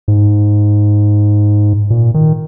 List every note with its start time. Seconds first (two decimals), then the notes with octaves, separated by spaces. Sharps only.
0.08 G#2
1.90 A#2
2.14 D#3